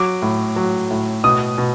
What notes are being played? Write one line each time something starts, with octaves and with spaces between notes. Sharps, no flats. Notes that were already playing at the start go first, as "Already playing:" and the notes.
Already playing: F#3 D6
A2
F#3
A2
B2 D#6
B2